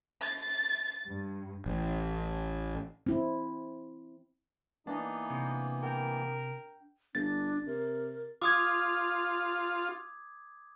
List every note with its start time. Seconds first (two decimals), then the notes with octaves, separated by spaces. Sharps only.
0.21 A6
1.08 G2
1.66 A1
3.07 C4 E4
4.87 E3 A#3 B3 D4 D#4
5.30 C3
5.83 A#4 G5
7.15 G1 D4 A6
7.67 C3 A#4
8.42 F4 D6 D#6 G#6